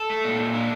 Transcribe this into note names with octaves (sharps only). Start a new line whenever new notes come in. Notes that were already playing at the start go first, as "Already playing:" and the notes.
Already playing: A4
A3
A#2
A#2
D4